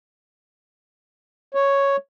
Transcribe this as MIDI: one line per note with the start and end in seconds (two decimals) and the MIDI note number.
1.55 1.96 73